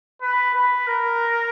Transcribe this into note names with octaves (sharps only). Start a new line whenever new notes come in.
B4
B4
A#4